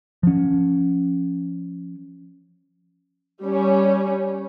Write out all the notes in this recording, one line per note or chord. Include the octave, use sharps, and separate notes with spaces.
F3 C#4
G3 C#4